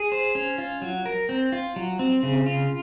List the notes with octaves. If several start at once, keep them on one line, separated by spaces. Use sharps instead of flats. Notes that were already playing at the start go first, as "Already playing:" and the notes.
Already playing: G#4
C5
C#4
F4
F#3
A#4
C4
F4
F#3
C4
C#3
F4